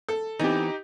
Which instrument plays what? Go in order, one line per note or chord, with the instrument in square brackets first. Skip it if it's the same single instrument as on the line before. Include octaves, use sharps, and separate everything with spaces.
[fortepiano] A4
[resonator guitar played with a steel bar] E3 B3 C4 [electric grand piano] D#4 G4